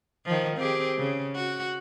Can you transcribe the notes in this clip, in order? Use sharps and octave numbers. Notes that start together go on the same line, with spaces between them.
D#3 F3
C4 G4 G#4
C#3
F#4